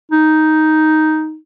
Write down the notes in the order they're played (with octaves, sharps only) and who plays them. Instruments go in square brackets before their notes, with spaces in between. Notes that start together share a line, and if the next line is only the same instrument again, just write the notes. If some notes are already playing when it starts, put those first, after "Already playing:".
[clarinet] D#4